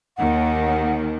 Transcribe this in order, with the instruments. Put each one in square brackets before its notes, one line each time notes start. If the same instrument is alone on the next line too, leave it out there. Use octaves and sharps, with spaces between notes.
[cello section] D#2 D#3 [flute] F#5